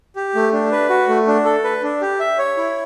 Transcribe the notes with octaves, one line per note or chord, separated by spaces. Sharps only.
G4
A3
D4
B4
F#4
A3
D4
A4
B4
D4
G4
E5
C#5
E4